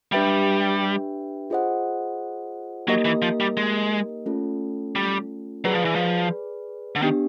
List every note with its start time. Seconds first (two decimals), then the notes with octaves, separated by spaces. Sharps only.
0.12 G3 D4 G4 B4 E5 G5
1.50 F4 G#4 C5 D#5 F#5
2.88 F#3 A#3 D#4 G4 A#4 D#5
3.05 E3
3.22 F3
3.40 G3
3.57 G#3
4.26 A3 C#4 F4 A4
4.96 G3
5.64 F#3 G#4 B4 D5
5.75 F3
5.85 E3
5.95 F3
6.96 D3
7.02 D#3 B3 D4 G4